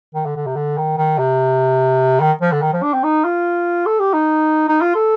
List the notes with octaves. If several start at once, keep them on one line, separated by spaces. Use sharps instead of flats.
D#3
D3
D3
C3
D3
D#3
D#3
C3
D#3
F3
D3
D#3
F3
D4
C4
D#4
F4
A4
G4
D#4
D#4
F4
A4